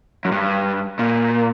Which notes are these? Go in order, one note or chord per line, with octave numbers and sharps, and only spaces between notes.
F#2
G2
A#2